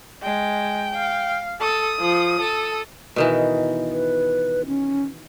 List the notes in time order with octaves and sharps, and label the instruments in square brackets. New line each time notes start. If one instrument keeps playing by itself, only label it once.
[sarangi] G#3 [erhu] G5
[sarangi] F5
[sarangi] A4 [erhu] D#6
[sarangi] F3
A4
[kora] B2 D#3 E3
[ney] B4
C#4